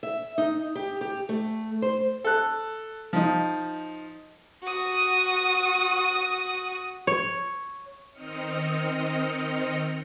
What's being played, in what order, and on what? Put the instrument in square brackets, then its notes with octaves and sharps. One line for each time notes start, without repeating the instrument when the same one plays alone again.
[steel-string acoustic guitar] E5
D#4
G4
G4
A3
C5
[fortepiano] A4 F#6
F3 D#4
[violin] F#4 D#6
[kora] C#5
[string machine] D#3 C4 D#5 F6 C#7